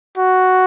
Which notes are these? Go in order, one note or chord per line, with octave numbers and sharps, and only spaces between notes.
F#4